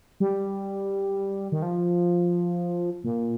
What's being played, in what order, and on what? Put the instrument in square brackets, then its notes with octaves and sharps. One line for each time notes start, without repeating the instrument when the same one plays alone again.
[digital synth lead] G3
D#3
F3
A#2